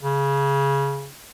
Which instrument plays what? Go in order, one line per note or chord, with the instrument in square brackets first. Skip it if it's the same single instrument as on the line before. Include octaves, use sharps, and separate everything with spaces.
[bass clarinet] C#3